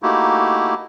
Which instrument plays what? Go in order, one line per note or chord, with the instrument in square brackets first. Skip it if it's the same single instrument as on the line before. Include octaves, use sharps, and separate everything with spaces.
[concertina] A3 A#3 D#4 E4 F#4 G4